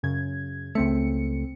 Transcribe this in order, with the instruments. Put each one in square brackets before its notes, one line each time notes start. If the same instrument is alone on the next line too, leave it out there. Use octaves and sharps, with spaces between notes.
[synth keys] F#2 C#3 G#6
[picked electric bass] C#2 A3 [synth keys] C4 C#7